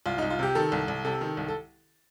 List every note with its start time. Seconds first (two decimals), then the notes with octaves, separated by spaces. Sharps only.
0.06 C2 F4
0.18 C2 D#4
0.30 F4
0.39 C3 G4
0.55 D#3 A4
0.72 C2
0.88 C2
1.05 C3 A4
1.21 D#3
1.37 C2
1.48 A4